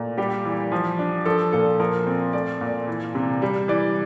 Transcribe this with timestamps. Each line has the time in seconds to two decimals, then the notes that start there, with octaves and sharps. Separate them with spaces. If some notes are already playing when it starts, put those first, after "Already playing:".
Already playing: A#2 A3
0.18 G3 G4
0.45 E3
0.72 F3
0.99 D4
1.25 F3 A4
1.53 A#2 A4
1.80 F3 A#4
2.07 C4
2.33 A3 D5
2.61 A#2
2.87 E3
3.15 C3
3.42 G3
3.68 E3 D5